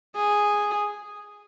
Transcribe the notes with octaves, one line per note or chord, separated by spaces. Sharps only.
G#4